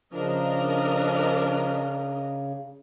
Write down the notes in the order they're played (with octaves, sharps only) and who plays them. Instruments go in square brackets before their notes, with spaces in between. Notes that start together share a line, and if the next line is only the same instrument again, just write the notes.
[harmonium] C#3 [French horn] F3 [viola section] D4 A#4 D#5